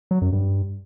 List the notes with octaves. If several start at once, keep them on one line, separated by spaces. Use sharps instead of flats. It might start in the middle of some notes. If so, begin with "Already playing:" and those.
F#3
F#2
G2